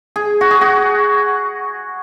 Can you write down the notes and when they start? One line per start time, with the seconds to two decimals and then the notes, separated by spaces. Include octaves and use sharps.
0.16 G#4
0.41 F#4
0.51 G#4
0.61 F#4